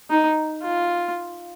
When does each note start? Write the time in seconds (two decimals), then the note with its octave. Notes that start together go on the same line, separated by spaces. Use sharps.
0.11 D#4
0.63 F4